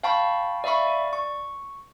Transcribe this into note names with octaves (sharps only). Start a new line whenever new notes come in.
F5 G5 A5 B5 C#6
D5 E5 F5 B5 C#6
D5
C#6